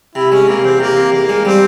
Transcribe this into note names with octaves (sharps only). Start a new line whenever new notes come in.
C3 E4
G#3 C#4
C3 A#3
E2 C4
C3 A#3
C3
E2 A#3
G#3
G3 C4